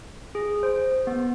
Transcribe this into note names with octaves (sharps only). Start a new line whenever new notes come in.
G#4
C5
B3